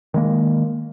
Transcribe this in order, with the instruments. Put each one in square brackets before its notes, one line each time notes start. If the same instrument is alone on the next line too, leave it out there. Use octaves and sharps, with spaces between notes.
[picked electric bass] D#3 G#3 A#3